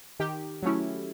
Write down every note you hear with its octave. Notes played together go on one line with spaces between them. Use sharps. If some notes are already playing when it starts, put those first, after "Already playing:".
D#3 G4
F#3 A3 C#4 E4